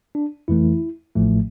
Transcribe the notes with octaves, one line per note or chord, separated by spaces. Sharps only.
D4
F2 E3 A3 E4
A1 A2 F3 A3